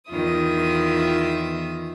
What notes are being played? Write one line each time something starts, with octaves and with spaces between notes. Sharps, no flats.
E2 D#3 F4 E5 D#6